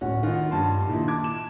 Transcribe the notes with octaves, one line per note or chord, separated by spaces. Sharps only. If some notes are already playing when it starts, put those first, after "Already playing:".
D1 C#4 F#4 F#5
D#3 F4 F#5
G2 A5 C6
A#2 D#3 E4
A5 D6 G#6
E7